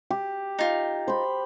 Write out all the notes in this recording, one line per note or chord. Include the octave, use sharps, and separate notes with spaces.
G4
D#4 F4
C5 B5